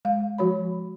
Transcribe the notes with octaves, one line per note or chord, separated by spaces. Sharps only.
G#3 F5
F3 F#4 C#5 B5